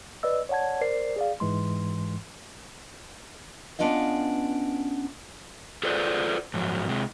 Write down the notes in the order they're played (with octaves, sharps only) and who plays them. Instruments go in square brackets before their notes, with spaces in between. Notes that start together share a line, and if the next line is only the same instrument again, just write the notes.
[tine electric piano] B4 D5 D#5 E6
C#5 D5 F#5 A5 G#6
A#4 C5 D5 C7
G#4 D5 F5
G#2 E3 G#3 C6
[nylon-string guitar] B3 C#4 D4 F4 D#5 F5
[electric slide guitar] F4 G#4 A4 B4 C5 D5
G#2 F3 F#3
C3 G#3